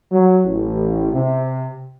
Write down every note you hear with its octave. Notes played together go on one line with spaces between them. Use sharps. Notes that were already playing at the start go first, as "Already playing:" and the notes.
F#3
A1
C3